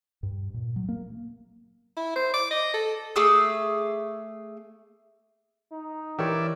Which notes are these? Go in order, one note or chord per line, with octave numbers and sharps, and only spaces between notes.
G2
A#2
F#3
A#3
E4
C5
D6
D#5
A4
A3 G#4 D6 E6
D#4
E3 G4 A#4 C#5 D5 E5